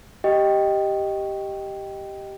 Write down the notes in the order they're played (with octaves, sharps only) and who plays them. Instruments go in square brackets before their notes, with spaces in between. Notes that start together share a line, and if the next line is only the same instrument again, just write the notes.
[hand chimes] G4 D#5 G5